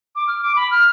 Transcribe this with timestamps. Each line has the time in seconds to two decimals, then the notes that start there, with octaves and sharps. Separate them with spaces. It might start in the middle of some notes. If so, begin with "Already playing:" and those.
0.16 D6
0.28 F6
0.42 D6
0.56 B5
0.71 F6